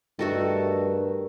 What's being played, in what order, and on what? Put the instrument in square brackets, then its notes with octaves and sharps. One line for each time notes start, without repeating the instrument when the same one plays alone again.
[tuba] G2 [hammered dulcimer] D#3 [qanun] A3 F#4 A4